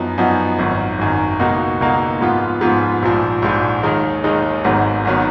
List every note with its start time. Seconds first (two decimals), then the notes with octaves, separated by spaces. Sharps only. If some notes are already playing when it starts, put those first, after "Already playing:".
Already playing: F#2 F3 B3 D#4
0.18 F#2 F3 B3 D#4
0.59 G#1 F#2 D#3
0.99 G#1 F#2 D#3
1.39 C#2 B2 A#3 D#4 F#4
1.81 C#2 B2 A#3 D#4 F#4
2.21 G#2 F3 B3 F4
2.61 G#2 F3 B3 F4
3.02 A#1 G#2 F3
3.42 A#1 G#2 F3
3.83 D#2 D#3 G#3 D#4
4.24 D#2 D#3 G#3 D#4
4.64 G#1 G#2 D#3 F#3 B3
5.05 G#1 D#3 F#3 B3